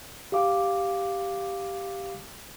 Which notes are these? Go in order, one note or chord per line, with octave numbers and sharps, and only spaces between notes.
G4 F5 D6